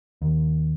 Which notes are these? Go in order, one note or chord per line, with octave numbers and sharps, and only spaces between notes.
D#2